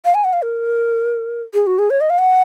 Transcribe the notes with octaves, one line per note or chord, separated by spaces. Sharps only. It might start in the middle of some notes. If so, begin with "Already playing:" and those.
F5
G#5
F#5
F5
A#4
G#4
F#4
G#4
C#5
D#5
F5
F#5